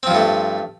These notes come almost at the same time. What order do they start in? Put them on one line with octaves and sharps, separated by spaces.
C4 F3 G2 A3